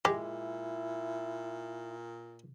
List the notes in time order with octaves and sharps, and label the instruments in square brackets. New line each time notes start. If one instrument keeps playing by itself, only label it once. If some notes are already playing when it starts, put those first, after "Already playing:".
[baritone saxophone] A#2 [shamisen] G#3 [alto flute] E4 [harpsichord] G4